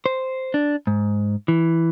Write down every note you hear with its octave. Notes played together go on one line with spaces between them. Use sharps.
C5
D4
G#2
E3